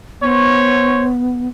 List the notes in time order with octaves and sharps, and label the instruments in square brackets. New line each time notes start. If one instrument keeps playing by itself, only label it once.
[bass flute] B3 [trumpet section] C5 C#5